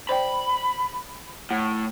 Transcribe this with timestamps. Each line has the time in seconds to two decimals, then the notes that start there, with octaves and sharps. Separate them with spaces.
0.09 C5 D5 G5 B5
1.51 A2 F#5